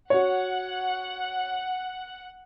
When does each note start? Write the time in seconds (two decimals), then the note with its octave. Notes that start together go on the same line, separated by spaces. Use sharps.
0.10 F#4 C#5 F#5